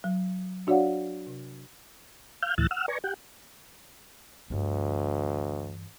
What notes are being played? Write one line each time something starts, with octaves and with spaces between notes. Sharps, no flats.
F#3
D4 F#4 C#5 D5 F5 F#5
C3
F5 F6 G6
D2 A2 E3 E6 F#6 A6
F#5 E6 F6
B4 D5 G#5 A#5 C#6
G4 F#5 G5
D2 G2 E3